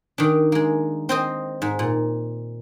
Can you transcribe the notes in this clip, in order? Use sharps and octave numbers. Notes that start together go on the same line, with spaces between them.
D#3 D4
G#3 A#3
C4 C5 D#5
G#2
A#2